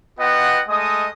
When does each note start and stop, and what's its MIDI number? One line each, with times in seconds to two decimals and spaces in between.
0.18 0.62 59
0.18 0.62 65
0.18 0.62 75
0.18 0.62 78
0.18 0.62 79
0.68 1.09 56
0.68 1.09 57
0.68 1.09 75
0.68 1.09 87